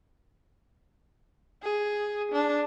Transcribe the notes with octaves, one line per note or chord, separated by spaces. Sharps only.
G#4
D4